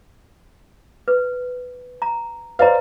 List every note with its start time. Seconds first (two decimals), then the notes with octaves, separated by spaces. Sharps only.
1.08 B4
2.02 A#5
2.59 B4 C5 D5 D#5 F5 A#5